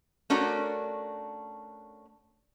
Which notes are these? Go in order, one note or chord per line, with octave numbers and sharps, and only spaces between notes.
A3 C#4 D4 F#4 A#4